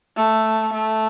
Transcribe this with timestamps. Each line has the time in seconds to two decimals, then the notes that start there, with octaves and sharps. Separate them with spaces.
0.17 A3
0.74 A3